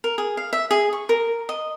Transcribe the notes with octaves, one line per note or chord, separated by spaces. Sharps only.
A#4
G#4
F5
E5
G#4
C#6
A#4
D#5